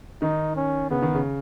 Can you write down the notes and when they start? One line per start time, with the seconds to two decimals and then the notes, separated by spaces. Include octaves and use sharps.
0.22 D#3 D#4
0.56 C#4
0.91 C#3 B3
1.02 D#3
1.15 C#3